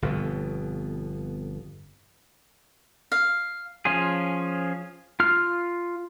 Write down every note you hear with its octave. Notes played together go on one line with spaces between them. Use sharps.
G1 F2 B2
F5
F3 C#4 F4 G#4
F4 F6